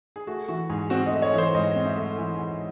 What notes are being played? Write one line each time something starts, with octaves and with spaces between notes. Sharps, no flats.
G#4
A3 F#4
E3 F#4
G#2 G#4
C4 F#4
D#5
A3
C#5
E3 C5
G#2 D#5
C4
E5
A3
E3
G#2